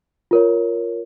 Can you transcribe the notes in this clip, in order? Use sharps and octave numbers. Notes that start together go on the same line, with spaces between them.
F4 A#4 C#5